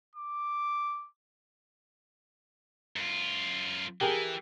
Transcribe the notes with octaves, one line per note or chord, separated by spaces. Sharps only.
D6
F#2 F4
E3 G4 G#4 A#4